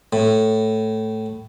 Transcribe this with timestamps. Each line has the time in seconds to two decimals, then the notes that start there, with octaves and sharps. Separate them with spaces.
0.13 A2